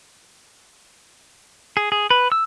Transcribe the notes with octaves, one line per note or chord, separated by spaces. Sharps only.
G#4
G#4
B4
E6